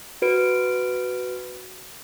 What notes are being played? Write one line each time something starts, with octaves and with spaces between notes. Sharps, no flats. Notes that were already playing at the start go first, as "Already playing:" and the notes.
F#4 B4 D7